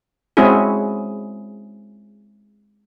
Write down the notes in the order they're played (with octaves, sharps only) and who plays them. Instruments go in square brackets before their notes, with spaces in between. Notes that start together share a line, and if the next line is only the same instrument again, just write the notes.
[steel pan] G#3 C4 C#4 E4 F#4 G#4